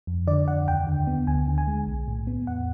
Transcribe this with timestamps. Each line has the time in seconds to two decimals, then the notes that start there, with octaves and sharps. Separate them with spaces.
0.07 F2
0.27 D3 D5
0.48 F2 F#5
0.67 D#2 G5
0.87 D3
1.07 B3
1.27 D2 G#5
1.47 D3
1.58 G#5
1.67 G#3
1.87 B1
2.08 A2
2.27 B3
2.47 E2 F#5